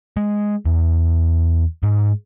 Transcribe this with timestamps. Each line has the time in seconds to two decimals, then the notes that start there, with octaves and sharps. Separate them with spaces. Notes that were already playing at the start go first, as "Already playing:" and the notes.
0.17 G#3
0.66 E2
1.83 G#2